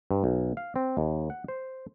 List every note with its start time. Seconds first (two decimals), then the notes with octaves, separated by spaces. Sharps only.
0.11 G2
0.24 B1
0.57 F5
0.76 C4
0.97 D#2
1.30 F#5
1.48 C5